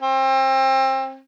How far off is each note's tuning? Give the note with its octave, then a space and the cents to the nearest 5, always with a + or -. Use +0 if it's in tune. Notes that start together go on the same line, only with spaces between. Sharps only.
C4 +30